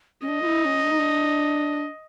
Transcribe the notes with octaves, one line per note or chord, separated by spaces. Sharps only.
C#4
D4 D#5
F4
E4
C#4
D4
D#4
D4